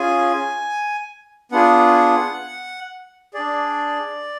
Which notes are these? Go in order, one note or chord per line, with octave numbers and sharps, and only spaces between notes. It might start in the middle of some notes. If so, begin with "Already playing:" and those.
Already playing: C#4 F4 G#4 G#5
B3 D4 F4 G#4 F#5
D4 G#4 D5